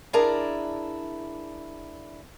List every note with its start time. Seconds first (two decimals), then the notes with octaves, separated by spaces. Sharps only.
0.13 D4 E4 G#4 A#4 D5